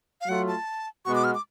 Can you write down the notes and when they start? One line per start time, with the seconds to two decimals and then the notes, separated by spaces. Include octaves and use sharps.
0.21 F5
0.28 F#3 A3 F4 F#5
0.48 A5
1.05 B2 G#3 B3 F#4 C#6
1.15 D6
1.24 F6
1.35 D6